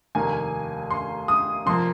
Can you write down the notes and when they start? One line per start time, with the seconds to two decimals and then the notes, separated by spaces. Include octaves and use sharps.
0.15 F1 D#2 D#3 A#3 G#5
0.90 C6
1.28 D#6
1.66 F1 F2 F3 A#3 C6